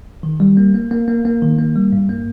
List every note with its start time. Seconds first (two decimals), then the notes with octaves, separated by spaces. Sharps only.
0.23 D#3
0.40 G3
0.57 A#3
0.74 A#3
0.91 A#3
1.08 A#3
1.25 A#3
1.42 D#3
1.59 A#3
1.76 G3
1.92 G2
2.09 A#3